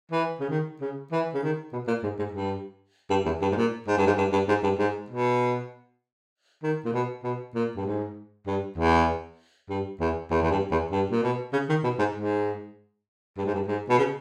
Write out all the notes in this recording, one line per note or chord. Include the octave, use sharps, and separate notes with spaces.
E3
C#3
D#3
C#3
E3
C#3
D#3
B2
A#2
G#2
G#2
G2
G2
E2
G2
G#2
A#2
G#2
G2
G#2
G2
G2
G#2
G2
G#2
B2
D#3
A#2
B2
B2
A#2
G2
G#2
G2
E2
G2
E2
E2
E2
G2
E2
G2
A#2
B2
C#3
D#3
B2
G#2
G#2
G2
G#2
G2
G#2
B2
C#3